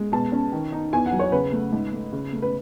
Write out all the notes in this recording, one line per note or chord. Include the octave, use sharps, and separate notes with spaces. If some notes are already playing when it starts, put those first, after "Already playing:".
Already playing: G#3
B2 A5
C#4
D#3
D#4
E2 G#5
F#5
F#3
C#5
C#3 B4
A3
G#2
A3
C#3
A3
B4